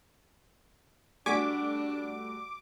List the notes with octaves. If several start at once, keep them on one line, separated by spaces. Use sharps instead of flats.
G3 A3 D4 F#4 G#5 C#6 D6 B6